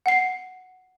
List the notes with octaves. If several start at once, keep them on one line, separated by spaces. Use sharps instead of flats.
F#5 C7